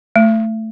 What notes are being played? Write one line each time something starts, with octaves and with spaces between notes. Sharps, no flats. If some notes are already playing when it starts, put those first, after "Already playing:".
A3